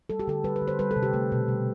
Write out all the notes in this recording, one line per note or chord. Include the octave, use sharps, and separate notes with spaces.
G3 A4
G4
D3 A4
G3 B4
B4
D3
C5
G3 B4
A4
C3
G4
A3
B2
G3